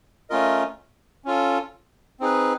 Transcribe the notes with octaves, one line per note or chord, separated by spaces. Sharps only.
A3 C#4 F4 A#4 D#5
C#4 F4 A4
C4 D#4 G#4 B4